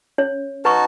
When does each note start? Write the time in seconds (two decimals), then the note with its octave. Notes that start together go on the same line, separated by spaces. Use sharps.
0.18 C#4 C#5
0.65 D#4 F#4 B4 A5 C#6